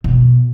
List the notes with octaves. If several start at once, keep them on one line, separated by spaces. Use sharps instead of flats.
B2